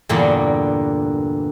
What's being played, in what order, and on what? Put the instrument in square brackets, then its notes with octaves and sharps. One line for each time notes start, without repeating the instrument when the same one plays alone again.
[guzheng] E2 G2 A#2 D3 A#3